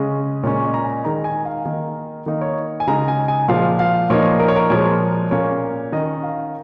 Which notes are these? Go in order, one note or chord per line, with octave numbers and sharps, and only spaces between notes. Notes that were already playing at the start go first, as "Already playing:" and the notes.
Already playing: C#3 G#3 C#4 D#5
A#2 G#3 C#4 C#5
D#5
A#5
G#5
D#3 G#3 D#4 A#5
G#5
F5
D#3 A#3 D#4
D#3 A#3 D#4
C#5
G#5
C#3 G#3 D#4 A#5
G#5
G#5
A#2 F3 G#3 F5
F5
A#2 F3 A#3 D#4 C#5
A#4
C#5
A#4
A#2 F3 G#3 C#5
A#2 A#3 C#4 C#5
D#3 C#4 D#5
F5